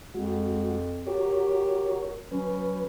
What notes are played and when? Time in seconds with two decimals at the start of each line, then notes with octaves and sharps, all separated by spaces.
0.15 F2 G#3 F#4
1.07 F#4 G4 A#4 C#5
2.31 F#3 C#4 B4